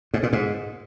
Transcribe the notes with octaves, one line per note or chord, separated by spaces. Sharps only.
G#2
A#2
G#2